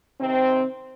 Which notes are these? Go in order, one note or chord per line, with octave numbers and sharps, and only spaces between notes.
C3 D#3 C4